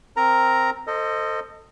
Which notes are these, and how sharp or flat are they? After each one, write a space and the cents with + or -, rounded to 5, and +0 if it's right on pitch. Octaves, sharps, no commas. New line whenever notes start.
C4 +0 A#4 +0 A#5 +0
A4 +30 C5 +0 D#5 -5